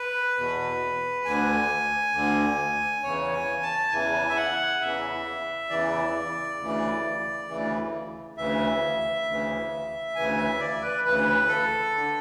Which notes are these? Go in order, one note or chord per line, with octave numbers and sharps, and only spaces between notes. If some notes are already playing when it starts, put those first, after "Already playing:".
Already playing: B4
E2 B2
D2 D3 G#5
D2 D3
E2 C#3 E3 C#5
G#5
A5
E2 C#3 E3 G#5
E5
F#5
E2 C#3 E3 E5
E2 C#3 E3 D5
D2 C#3 E3
D2 C#3 E3
D2 C#3 E3 E5
D2 C#3 E3
D2 C#3 E3 G#5
E5
D5
B4
D2 C#3 E3 B4
A4
D3